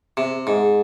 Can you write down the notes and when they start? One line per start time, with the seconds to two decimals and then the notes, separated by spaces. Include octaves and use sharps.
0.17 C3
0.47 G#2